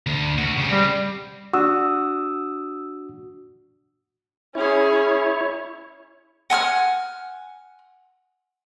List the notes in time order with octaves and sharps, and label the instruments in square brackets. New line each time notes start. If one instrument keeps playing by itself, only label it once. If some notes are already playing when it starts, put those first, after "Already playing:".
[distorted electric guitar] D2
D2 F#4
C#3 C4
[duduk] G3
[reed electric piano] D4 F#4 [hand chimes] D#6 E6
[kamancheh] C#4 G#4 [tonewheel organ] E4 C#5
[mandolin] F#5 G#5 E6 F6